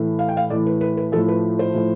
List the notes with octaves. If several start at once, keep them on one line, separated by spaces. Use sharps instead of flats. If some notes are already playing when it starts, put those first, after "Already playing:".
Already playing: A2 E3 A3
F5
G5
F5
A2 E3 A3 D5
B4
B4
B4
A2 F3 A3 A4
B4
C5
A2 F3 A3